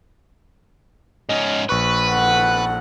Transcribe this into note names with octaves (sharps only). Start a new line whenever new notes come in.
G#2 C#4 D#5
A#1 B4 C#6 F#6
A4 F#5